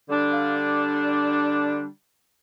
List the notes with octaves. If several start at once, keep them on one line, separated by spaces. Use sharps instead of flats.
D3 G3 D4
F5
D5